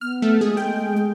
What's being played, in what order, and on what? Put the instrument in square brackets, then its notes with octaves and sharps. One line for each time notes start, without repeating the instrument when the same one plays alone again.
[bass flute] B3 [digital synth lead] F6
[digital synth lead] A3
[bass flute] G#3 [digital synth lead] G#4
[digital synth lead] G5
[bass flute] G#4